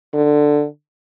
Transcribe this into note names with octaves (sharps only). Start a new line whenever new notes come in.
D3